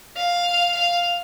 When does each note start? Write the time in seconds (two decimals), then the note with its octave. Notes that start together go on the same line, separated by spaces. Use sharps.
0.16 F5
0.75 F5